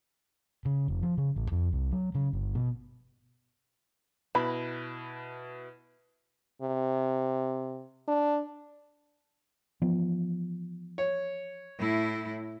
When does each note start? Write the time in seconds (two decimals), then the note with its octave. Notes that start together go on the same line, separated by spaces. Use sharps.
0.65 C#3
0.88 F1
1.02 F3
1.18 C#3
1.36 A1
1.52 F2
1.73 C2
1.92 F#3
2.15 C#3
2.33 G1
2.55 B2
4.35 B2 E4 B4 B5
6.62 C3
8.08 D4
9.82 E3 F3 B3
10.98 C#5
11.78 A2 E4